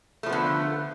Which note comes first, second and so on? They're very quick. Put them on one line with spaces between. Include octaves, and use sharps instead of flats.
A3 F3 B3 D3